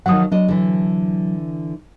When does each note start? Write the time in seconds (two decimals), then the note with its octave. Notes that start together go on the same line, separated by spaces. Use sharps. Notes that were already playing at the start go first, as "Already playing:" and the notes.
0.06 D#3 F3 F#3 F#5 D#6
0.32 F#3 D4 D#5
0.48 D3 E3